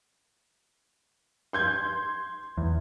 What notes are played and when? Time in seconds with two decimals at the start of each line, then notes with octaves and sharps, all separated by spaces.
1.53 C6 G6 G#6
2.57 E2